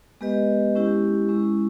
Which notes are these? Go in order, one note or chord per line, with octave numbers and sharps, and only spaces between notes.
G#3 B3 G4 B4 D#5
G#3 C#4 E4 G4
G#3 C#4 E4